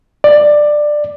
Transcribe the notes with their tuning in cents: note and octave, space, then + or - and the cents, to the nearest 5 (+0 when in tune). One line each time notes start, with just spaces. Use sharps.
D5 +15